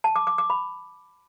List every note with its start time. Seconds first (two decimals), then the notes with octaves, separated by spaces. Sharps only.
0.04 A5
0.16 D6
0.27 D6
0.38 D6
0.50 B5